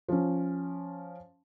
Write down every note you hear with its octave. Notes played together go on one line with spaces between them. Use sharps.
F3 C#4